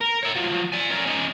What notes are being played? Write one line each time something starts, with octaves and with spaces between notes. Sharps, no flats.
A#4
C#5 E5
F3 F#3
D5 G#5
C#4 A#4
C#4 D#4